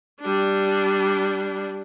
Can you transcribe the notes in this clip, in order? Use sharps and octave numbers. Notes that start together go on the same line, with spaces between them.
G3 D4